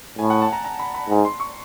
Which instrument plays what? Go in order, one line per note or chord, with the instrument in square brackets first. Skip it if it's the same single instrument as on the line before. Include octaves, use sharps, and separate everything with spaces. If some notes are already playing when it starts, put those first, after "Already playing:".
[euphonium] A2 [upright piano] G#5
[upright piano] F#5
A5
A#5
A#5
B5
B5
[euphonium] G#2
[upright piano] C6
C#6